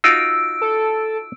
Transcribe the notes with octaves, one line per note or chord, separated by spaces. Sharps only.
D#4 F4 F#4 E6 D7
A4